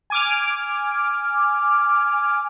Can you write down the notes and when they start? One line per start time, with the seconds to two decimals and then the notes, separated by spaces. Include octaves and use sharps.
0.10 G#5 D6 F6